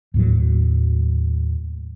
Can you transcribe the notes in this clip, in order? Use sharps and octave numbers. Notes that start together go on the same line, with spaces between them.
D#2 A2 F#3